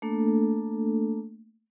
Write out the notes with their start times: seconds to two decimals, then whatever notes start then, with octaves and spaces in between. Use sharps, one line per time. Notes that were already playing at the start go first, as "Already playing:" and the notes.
0.02 A3 A#3 D4 A4